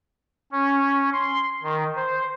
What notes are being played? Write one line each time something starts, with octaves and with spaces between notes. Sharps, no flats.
C#4
C6
D#3
C5